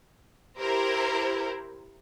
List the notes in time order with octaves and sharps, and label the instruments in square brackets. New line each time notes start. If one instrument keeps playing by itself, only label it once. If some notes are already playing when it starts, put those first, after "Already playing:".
[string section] E4 G4 A#4 C5